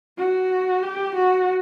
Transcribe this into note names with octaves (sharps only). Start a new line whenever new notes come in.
F#4
G4
F#4